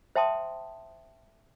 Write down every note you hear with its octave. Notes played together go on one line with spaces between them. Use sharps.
C5 E5 G5 A5 C6 D#6